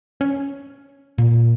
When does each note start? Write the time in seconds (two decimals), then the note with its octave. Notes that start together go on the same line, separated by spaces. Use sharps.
0.21 C#4
1.18 A#2